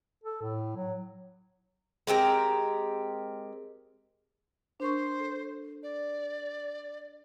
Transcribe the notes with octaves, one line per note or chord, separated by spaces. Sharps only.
A4
A2
F#3
G#3 C4 G4 A#4
D4 A#4 C5 C#6
A4
D5